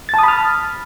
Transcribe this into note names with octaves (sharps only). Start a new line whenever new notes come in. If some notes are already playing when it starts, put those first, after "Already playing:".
A5 B5 D#6 F6 A6